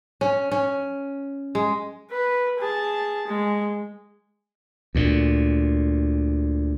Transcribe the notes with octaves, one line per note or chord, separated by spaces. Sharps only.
C#4
C#4
G#3
B4
G#4 A5
G#3
D2 A#2